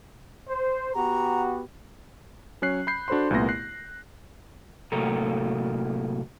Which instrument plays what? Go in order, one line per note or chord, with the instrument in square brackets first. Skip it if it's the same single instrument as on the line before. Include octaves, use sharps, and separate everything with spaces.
[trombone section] C5
[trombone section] B3 F#4 G4 [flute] A#5
[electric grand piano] F#3 C#4 C#5 F#6 C7
B5 G6 C7
D4 F#4 A4 C5 B5 C6
C2 A#2 A3 B3 C6 A#6
F#6 C7
[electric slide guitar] A2 C3 F#3 A#3 A4 A#5